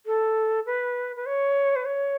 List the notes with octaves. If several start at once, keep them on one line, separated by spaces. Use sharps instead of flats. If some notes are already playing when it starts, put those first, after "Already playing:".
A4
B4
B4
C#5
B4
C#5